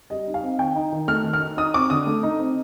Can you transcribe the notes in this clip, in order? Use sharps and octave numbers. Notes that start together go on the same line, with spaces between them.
G3 D#5
D#4
F5
C4
D#3 G5
D#4
D#3
A3 F6
D#3
F6
D#4
D#4 D#6
C4 D6
D3 D#6
A3
D#4
C4